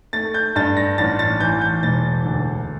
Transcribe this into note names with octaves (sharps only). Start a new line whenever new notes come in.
A3 A6
G6
G2 A6
A#6
A1 A6
A6
E3 G6
G6
E1 A6
D2